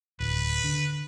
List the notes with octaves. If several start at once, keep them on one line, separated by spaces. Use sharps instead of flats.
D1 B4
D3